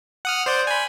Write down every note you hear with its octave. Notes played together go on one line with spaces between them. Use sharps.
F#5 D#6 F6
C5 D5 C6
G#5 B5